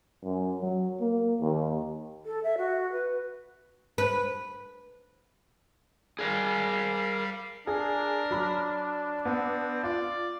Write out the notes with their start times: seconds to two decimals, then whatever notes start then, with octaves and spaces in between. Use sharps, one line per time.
0.24 F#2
0.61 F#3
1.00 A#3
1.40 D#2
2.26 A4
2.44 E5
2.58 F#4
2.92 B4
3.98 B4
6.19 G3 G#4 A#4 F5
7.67 D4 G#4 A#4
8.31 F#3 B5 F6
9.25 B3 C4
9.84 F4 D5